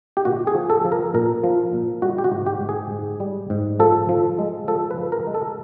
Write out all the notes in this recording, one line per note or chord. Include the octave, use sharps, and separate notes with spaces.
G4
A#2 F#4
G#4
F3
A4
F3
A#4
A#2 A#4
F3
A#2
G3 F#4
G4
F#4
G#2
G4
G#2
G#4
G#2
G3
G#2
F3 A4
F3
G#3
F3 A4
B4
F3
A#4
G#3
A4